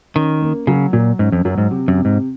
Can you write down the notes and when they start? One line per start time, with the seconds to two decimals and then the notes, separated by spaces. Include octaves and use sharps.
0.15 D#3 C#4
0.42 A#3
0.67 C#3 F#3
0.93 A#2 F#3
1.19 G#2 C#4
1.32 F2
1.45 F#2 F#3
1.58 G#2
1.71 C3
1.88 F#2
1.97 C3
2.05 G#2